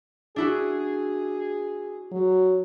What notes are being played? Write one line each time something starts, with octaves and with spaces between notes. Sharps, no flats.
D4 E4 F#4 G#4
F#3